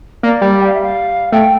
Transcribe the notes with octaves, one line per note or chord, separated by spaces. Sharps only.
A#3 D5
G3
G5
F5
E5
F5
A3 G5